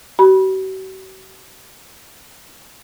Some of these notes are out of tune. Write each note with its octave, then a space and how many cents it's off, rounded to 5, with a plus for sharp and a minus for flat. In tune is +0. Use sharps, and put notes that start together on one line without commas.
F#4 +45 B5 -25